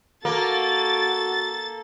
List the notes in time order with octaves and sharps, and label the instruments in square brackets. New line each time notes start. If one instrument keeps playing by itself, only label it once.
[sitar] A#3 [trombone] F#4 [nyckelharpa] A4 [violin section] A6